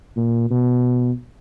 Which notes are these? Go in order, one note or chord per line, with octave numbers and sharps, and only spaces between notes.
A#2
B2